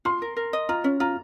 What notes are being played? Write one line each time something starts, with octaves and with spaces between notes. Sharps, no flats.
F4 C6
A#4
A#4
D#5
F4 A#5
C#4
F4 A#5